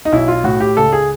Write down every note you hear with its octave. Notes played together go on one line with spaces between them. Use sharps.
D#4
B1 E4
F4
A2 F#4
G4
C#2 A4
G#4